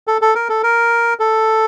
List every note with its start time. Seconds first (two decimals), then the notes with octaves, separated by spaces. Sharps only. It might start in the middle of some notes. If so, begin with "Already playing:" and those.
0.07 A4
0.22 A4
0.35 A#4
0.49 A4
0.63 A#4
1.20 A4